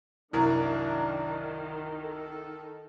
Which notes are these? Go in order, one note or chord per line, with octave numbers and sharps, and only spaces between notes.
C2 F#2 D#3 D4 E4 A#4
A4